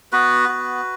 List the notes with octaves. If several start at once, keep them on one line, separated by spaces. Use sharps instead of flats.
B3 F#4 B4
F#4